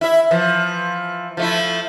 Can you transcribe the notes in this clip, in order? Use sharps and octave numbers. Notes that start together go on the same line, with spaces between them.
E4 E5
E3 F3
F3 A3 E4